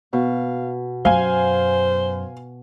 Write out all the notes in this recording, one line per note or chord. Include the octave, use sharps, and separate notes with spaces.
B2 F5
F#2 C5 F5 G#5